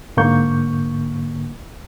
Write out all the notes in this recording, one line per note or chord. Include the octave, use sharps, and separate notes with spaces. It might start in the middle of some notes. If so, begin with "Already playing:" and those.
G#2 D3 A#3 C#6 G6